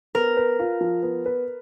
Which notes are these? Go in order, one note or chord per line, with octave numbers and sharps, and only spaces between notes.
B3 A#4
B4
F4
F3
B3
B4